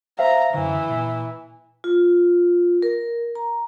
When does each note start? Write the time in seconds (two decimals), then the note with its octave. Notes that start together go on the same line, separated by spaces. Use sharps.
0.19 C5 E5 F5 A#5
0.54 F#2 D3 E3
0.89 A#2
1.84 F4
2.82 A#4
3.35 A#5